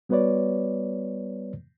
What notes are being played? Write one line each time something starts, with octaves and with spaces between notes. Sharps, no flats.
G3 B3 F#4 B4 C#5 D5